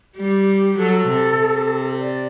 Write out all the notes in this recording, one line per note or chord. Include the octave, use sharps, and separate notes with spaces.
G3 G4
F#3 A4
C3
C3
D5